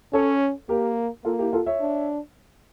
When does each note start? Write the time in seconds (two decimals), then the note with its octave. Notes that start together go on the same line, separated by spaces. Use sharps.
0.13 C#4 A4 C#5
0.69 A#3 G4 A#4
1.25 A#3 F4 A4
1.39 E4 G4
1.53 F4 A4
1.66 C#5 E5
1.81 D4